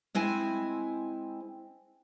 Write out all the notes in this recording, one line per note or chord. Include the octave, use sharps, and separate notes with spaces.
G#3 C4 E4 G#5